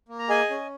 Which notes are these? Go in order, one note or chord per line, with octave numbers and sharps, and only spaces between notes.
A#3
A#5
G#4 D#5 G#5
C#4